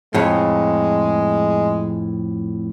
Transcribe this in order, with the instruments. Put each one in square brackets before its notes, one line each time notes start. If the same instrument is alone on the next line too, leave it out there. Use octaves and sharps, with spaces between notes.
[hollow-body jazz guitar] F2 A2 [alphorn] G#3